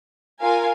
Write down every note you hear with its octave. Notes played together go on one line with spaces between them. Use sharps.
F4 A#4 F5 G#5